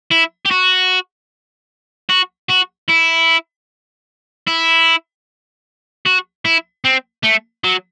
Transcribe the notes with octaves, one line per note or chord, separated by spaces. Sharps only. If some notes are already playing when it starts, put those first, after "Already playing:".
E4
G4
F#4
F#4
F#4
E4
E4
F#4
E4
C4
A3
F#3